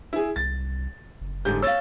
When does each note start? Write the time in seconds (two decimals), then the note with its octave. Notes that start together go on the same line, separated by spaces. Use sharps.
0.13 E4 G#4
0.36 C2 A6
1.21 F#1
1.45 G#2 D3 G3 G#3 G6
1.62 C#5 F5 E6 A6